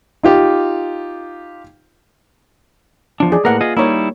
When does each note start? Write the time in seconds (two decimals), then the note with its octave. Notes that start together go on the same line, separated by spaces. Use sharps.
0.23 D#4 F4 G4
3.20 E2 F3 D4
3.32 G#4 D5
3.45 A2 A#3 A#4 B4 F#5
3.61 F4 G#4 D#5
3.77 G3 A#3 D#4 E4 C#5